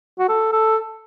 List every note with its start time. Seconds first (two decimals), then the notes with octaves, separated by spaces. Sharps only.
0.19 F#4
0.29 A4
0.52 A4